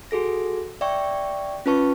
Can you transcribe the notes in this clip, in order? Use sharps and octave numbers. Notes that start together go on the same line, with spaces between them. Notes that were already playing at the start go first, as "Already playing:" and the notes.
F#4 G#4 A4 A#6
D5 E5 G5 C#6
C#4 F4 B4 A5 C#6